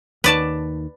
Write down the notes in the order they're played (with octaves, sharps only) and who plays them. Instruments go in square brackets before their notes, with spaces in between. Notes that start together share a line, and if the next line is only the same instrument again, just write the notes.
[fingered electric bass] D#2 D#3 [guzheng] B4 D5 A5